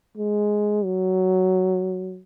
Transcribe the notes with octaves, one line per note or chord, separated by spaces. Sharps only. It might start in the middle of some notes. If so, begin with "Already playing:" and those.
G#3
F#3